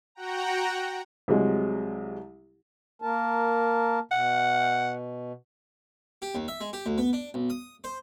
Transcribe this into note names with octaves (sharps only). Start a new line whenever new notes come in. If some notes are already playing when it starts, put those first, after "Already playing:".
F#4 F#5 G5 A#5
C2 C3 F#3 G#3
A#3 A#4 A5
B2 F#5
G4
D#2
E5
G#3
G4
D2
B3
D4
B1
D#6
C5